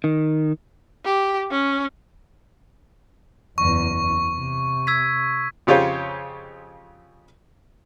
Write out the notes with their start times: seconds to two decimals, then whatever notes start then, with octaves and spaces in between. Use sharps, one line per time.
0.04 D#3
1.05 G4
1.51 C#4
3.58 F#1 E2 C#6
4.37 C3
4.87 E6 G#6 B6
5.67 F2 C#3 F4 G4 C5 C#5